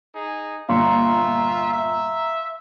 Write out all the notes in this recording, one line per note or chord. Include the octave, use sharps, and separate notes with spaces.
D#4 G#4
G1 A#2 F4 E5 F5 A#5 C6 C#7
E5